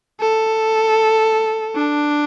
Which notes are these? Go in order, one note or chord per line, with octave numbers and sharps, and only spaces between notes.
A4
D4